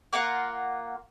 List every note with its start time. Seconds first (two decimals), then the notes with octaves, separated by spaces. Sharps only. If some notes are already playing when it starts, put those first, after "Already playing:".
0.13 A#3 F4 A#4 F#5